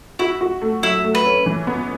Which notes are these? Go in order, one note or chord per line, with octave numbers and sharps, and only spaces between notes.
E4 F#4
F#4
A3
F#3 E4
A3
B4
C#4
E3
B3